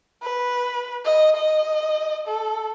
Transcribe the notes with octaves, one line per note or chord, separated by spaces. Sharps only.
B4
D#5
D#5
A4